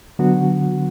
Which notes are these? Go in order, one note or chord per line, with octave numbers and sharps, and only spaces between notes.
D3 F#3 B3 F#4